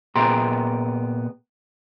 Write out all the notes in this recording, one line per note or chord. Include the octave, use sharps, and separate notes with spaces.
A#2 B3 G#4 G5 A#5 C6